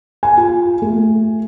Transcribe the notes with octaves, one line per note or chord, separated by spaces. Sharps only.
G#5
F4
A3